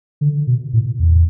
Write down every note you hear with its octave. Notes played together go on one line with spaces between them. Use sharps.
D3
B2
A2
E2